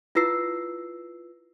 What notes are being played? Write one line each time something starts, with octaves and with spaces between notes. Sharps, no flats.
E4 F4 B4 E6 C7